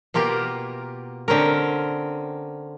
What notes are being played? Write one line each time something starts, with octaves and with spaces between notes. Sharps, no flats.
B2 A#3 F4 G4 A#4
D3 C4 C#4 A#4